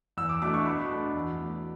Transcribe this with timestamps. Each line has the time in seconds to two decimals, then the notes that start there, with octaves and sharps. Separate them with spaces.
0.17 E2 E6
0.29 D6
0.41 B2 A3 D4 D6
0.54 C#6
0.66 B2 B5
0.90 A3 D4
1.14 E2
1.39 B2 A3